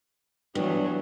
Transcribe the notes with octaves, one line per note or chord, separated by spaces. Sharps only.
G2 E3 F#3 B3 D4